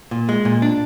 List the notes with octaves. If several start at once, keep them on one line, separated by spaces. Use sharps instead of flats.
A#2
G#3
A#2
D4